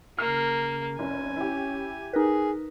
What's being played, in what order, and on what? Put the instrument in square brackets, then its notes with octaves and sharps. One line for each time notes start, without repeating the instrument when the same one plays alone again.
[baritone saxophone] C#3 [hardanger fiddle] A#3 [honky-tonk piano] F6 C7
[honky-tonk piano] F1 [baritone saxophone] C#4 [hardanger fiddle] G#5
[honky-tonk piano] E4 G4
[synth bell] D#4 A#4 B4 [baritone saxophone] G#4